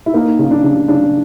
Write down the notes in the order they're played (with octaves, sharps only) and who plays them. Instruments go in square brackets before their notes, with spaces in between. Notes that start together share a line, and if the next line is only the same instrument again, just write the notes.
[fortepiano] E4
A#3 D#4
C#3
D4
C#3
C#3 D4